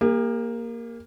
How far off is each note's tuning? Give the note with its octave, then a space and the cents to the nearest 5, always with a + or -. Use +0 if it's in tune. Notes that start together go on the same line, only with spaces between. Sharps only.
A#3 +0 G4 +45